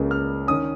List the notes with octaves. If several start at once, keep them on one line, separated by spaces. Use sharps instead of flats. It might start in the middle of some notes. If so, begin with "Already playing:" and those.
Already playing: C#2 C#3 A#3 C#4
F6
D#3 C#4 D#6